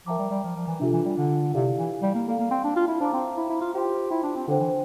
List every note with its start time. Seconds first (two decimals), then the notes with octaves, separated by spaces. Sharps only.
0.06 F3 A#4 E5 G5 A#5 D6
0.19 G3
0.31 G3
0.44 F3
0.56 F3
0.67 E3
0.80 C3 D4 F4 A4
0.93 E3
1.05 G3
1.17 D3
1.54 C3 E4 G4 D5 F5
1.79 E3
2.02 G3
2.15 A#3
2.28 A#3 A4 D5 F5
2.39 A#3
2.51 C4
2.64 D4
2.76 F4
2.88 E4
3.00 D4 C5 F5 A#5 D6
3.14 C4
3.37 E4
3.50 E4
3.61 F4
3.74 F4 G4 C5 G5 C6
4.10 E4
4.23 D4
4.36 C4
4.48 D3 D4 A4 C5 G5
4.60 E3